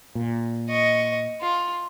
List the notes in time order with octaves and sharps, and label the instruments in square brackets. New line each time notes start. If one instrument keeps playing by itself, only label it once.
[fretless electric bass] A#2
[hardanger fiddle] D#5 C#6
F4